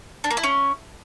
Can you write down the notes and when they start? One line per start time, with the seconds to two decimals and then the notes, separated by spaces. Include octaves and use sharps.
0.24 D4
0.31 A#3
0.37 E4
0.44 C#4